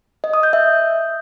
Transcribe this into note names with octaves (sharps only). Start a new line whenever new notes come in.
D#5
D#6
G6
E5